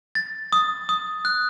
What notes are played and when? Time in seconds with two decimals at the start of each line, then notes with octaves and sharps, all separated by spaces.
0.15 A6
0.52 D#6
0.89 D#6
1.25 F#6